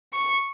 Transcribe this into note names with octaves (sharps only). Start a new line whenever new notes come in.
C#6